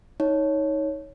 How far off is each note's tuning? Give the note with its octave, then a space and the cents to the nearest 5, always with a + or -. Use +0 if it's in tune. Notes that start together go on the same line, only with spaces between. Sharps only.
D#4 +20 C#5 +0